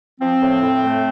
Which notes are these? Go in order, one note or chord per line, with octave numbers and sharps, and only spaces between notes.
F3 C4
A2
A2
A3